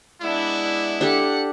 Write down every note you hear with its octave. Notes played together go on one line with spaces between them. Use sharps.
G#3 B3 D4 E4 D5
D4 G4 A4 F#5 C#7